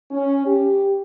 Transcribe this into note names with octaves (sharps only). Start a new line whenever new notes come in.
C#4
G4